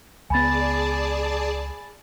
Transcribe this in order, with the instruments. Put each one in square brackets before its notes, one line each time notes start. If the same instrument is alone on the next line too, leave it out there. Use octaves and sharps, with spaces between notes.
[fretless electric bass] C#2 B3 [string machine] G#4 D5 A5 [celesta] G#5 B5 A6